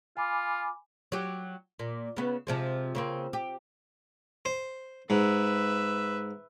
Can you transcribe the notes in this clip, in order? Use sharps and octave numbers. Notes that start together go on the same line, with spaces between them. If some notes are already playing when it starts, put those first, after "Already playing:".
F4 G#5 B5 D6
F#3 G4
A#2
C#3 B3
C3 F3 G#3
C#3 A#3 C4
G4
C5
G#2 B4 E5